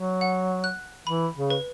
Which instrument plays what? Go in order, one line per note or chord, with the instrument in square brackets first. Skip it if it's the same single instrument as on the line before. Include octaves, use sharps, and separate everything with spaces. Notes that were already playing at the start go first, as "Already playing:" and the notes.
Already playing: [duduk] F#3
[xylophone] F#5
F#6
[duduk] E3 [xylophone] B5
[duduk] C#3
[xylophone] B4